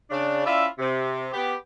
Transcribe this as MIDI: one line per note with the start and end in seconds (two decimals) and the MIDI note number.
0.11 0.43 49
0.11 0.43 62
0.45 0.65 61
0.45 0.65 64
0.45 0.65 65
0.45 0.65 74
0.45 0.65 76
0.79 1.26 48
1.33 1.54 59
1.33 1.54 67